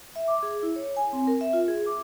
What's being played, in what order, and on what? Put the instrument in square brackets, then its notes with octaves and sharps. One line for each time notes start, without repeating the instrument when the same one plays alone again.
[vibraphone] E5
D6
G#4
E4
C#5
G#5
C4
A#4
E5
F4
G#4
D6